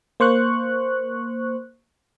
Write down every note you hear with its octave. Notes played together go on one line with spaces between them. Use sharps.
A#3 C5 C#6 F#6